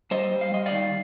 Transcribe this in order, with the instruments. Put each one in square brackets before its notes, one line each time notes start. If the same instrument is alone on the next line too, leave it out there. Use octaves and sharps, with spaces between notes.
[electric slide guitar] G3 C5 D#5
G3
F5
G3 D#5
D5 F5
D#3